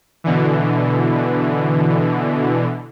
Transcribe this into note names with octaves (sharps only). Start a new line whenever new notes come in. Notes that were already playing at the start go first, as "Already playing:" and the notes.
B2 D3 E3